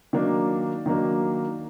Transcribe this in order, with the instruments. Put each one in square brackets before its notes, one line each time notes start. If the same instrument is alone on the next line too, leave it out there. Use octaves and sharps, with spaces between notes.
[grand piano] D#3 F#3 A#3 D4
D#3 F#3 A#3 D4